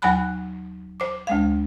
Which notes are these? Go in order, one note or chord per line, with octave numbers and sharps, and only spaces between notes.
D#2 F#3 F#5 G#5 B5 F#6
C5 D6
D2 G#3 F5